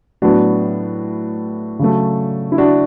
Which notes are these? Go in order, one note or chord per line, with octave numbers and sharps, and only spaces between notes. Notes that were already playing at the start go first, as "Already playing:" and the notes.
A2 F#3 B3 D4 F#4
C#3 F#3 A3
E4
D4 F#4